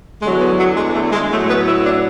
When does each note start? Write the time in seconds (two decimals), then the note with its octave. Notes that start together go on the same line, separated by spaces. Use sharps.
0.22 E2 D3 F#3 G#3
0.39 B3
0.58 F#3
0.75 G#3
0.94 A3
1.12 G#3
1.30 A2 F#3 A3
1.48 B3
1.66 E4
1.85 D4